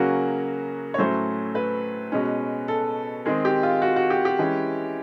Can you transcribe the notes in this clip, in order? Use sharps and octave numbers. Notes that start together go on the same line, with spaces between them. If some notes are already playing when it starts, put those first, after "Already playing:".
Already playing: C#3 F#3 A#3 C#4 F#4
C#5
A2 F#3 A3 C#4 C5
B4
B2 G#3 C#4
A4
D#3 G#3 C4 G#4
G4
F4
F#4
F#4
G4
G4
E3 G#3 C#4